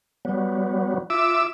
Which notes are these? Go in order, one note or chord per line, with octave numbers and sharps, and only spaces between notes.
F#3 G3 B3
F4 E5 D6 E6